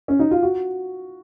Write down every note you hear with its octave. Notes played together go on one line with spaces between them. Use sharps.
C#4
D#4
F4
F#4